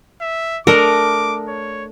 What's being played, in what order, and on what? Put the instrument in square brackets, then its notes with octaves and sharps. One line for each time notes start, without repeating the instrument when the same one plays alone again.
[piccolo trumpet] E5
[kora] A3 D4 D#5 [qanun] A#4 [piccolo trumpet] D6
[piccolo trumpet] C#5